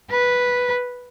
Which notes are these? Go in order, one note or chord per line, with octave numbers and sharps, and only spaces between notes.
B4